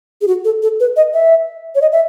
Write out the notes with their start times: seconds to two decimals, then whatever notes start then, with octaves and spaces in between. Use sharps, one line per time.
0.21 G#4
0.28 F#4
0.45 A4
0.63 A4
0.80 B4
0.96 D#5
1.14 E5
1.75 C#5
1.82 D#5
1.92 E5